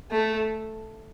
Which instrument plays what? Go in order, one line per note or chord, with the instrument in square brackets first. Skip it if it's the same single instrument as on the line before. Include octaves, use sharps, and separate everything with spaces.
[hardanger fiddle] A3